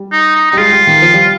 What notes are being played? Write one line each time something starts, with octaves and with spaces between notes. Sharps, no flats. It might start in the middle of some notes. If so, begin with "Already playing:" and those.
Already playing: G3
D#4
D#4
G3 D#4
G#3 F4
G3
D#3
F3
G3